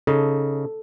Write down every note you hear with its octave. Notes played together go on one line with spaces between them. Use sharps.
C#3 D#4 A4